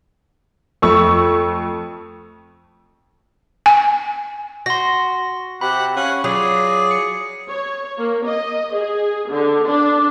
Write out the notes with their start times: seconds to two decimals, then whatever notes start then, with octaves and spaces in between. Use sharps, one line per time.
0.82 F2 A3 C#6 E6
3.66 G#5
4.66 F#4 C6 A#6
5.61 C3 G4 F#5 B5
5.96 C#4 F5 F#5 G#5
6.24 F#3 F4 G#4 D5
6.91 C#7
7.49 C#5
7.98 A#3
8.27 D#5
8.77 G#4
9.31 D3
9.68 D4